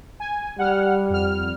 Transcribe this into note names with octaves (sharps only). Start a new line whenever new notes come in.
G#5
G3 F#5 F6
F2 F6